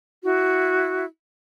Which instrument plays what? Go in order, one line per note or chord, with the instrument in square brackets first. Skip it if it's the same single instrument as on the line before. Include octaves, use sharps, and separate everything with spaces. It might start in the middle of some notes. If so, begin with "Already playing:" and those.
[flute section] E4 F#4